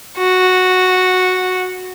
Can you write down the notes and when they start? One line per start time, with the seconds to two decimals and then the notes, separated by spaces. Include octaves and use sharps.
0.18 F#4